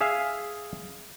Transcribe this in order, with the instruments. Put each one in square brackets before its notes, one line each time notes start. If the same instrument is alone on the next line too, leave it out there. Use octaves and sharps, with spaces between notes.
[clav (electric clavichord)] G#4 E5 F5 G#5